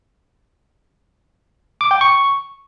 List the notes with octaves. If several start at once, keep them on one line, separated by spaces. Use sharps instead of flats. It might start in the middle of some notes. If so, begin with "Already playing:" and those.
D6
G5
C#6